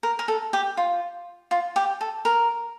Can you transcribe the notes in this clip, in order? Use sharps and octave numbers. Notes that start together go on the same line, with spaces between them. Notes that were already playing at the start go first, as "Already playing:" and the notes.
A#4
A#4
A4
G4
F4
F4
G4
A4
A#4